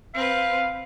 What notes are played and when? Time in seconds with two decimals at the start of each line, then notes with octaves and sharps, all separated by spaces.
0.14 C4 B4 F5